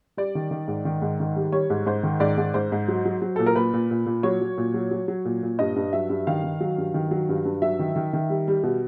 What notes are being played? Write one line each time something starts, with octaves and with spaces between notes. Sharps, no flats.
G3 D5
D#3
D#3
G#2
D#3
G#2
D#3
G3
G3 C#5
G#2
G#2 C5
D#3
G#2 D5
G#2
G#2 C5
G#2
F#3
F#3
F#3
A#2 A4
A#4
A#2 B4
A#2
A#2
A#2
F#3 C#5
F#3
A#2
F#3
F#3
F#3
A#2
A#2
G2 D#5
G2
F#3 E5
G2
D#3 F5
D#3
F#3
G2
D#3
F#3
G2
G2
F#3 E5
D#3
D#3
D#3
G3
G3
B2